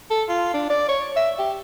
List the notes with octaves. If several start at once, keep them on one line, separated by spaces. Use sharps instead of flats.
A4
F4
D4
D5
C#5
E5
G4